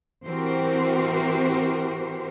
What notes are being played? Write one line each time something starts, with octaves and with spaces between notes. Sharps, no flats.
E3 C4 F#4 G4 A#4 C5